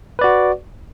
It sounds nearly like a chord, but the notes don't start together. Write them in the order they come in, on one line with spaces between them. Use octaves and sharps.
B4 D5 F#4